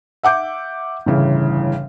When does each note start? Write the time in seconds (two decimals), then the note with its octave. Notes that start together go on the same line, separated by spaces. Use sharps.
0.23 E5 F#5 D6 G6
1.06 G1 A2 C#3 E3